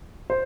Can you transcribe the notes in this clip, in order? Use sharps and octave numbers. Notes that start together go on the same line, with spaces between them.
C5